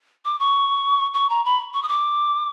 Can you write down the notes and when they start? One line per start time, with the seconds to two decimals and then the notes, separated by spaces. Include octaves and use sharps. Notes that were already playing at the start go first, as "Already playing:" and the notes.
0.25 D6
0.40 C#6
1.14 C#6
1.30 A#5
1.45 B5
1.74 C#6
1.83 D#6
1.88 D6